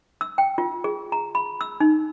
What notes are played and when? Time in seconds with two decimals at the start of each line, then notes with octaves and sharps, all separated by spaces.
0.21 E6
0.38 G5
0.58 F4
0.84 G#4
1.12 A#5
1.35 B5
1.61 E6
1.80 D#4